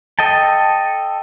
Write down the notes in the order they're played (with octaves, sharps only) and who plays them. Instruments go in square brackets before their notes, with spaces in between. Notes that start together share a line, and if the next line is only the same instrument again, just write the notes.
[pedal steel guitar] A4 D#5 G5 A5